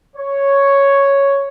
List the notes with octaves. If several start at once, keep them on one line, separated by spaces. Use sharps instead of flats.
C#5